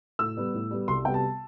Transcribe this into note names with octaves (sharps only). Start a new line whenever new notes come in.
A2 E6
G3 B3
A2
G3 B3
C2 C6
C3 G3 B3 G5
A5